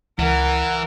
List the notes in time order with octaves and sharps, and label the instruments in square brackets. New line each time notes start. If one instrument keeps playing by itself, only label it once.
[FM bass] C#2 [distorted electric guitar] E3 [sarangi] A#4 [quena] F#5